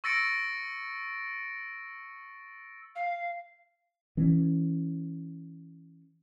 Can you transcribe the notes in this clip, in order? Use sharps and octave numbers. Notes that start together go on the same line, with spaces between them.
C#6 E6 A6 A#6 C#7 D7
F5
E3 C#4